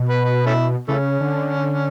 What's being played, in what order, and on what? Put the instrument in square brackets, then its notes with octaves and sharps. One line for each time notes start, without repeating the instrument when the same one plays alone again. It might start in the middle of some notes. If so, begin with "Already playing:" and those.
Already playing: [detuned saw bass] B2
[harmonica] B4
B4
A3 C#4 E4
[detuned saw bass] C#3 [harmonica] E3 A3 C#4
[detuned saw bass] D3